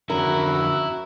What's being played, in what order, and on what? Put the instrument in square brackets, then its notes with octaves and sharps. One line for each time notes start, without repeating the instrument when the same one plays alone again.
[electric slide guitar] F2 D3 C#4 [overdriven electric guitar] E4 [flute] F#4 [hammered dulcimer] A#4